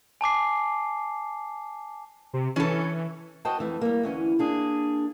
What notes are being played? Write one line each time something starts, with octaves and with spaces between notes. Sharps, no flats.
G#5 A5 D6 C7
C3
E3 C#4 A4
F#4 C5 D#5 G5 A5
F2 E3 A3
G3 A#3
D2 E3 C#4
A#3 D4 G#4